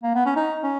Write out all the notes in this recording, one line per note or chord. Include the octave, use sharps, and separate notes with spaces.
A#3
B3
C#4
D#4
C#4